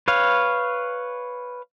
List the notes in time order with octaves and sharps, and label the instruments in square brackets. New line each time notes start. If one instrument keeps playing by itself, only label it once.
[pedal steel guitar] B4 C#5 F5